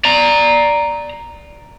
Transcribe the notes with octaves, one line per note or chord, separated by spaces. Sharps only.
D5 A#5